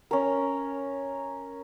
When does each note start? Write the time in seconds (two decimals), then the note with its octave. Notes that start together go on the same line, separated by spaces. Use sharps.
0.11 C#4 A#4